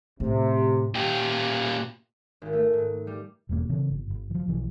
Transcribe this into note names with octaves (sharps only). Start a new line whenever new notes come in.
A2 C3
A#2 G4
G#1
A3
G#2
G3
E1 E2 F#3 A#3
C#3 E3 C4
G1
G1
E3 F3
B1 E3 F3